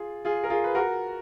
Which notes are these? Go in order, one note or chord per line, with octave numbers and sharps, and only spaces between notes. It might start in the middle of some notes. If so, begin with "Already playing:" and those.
Already playing: F4 G#4
F4 G#4
A#4
F4 G#4
B4
F#4 A#4